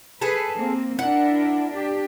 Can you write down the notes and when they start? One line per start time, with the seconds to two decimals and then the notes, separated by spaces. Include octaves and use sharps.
0.21 G#4 A4 B4
0.56 A#3 C4
0.99 D4 E4 A#4 F#5
1.71 D4 G4